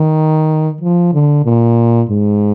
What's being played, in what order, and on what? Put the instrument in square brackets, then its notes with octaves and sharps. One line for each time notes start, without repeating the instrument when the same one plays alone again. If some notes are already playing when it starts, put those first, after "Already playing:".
Already playing: [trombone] D#3
F3
D3
A#2
G#2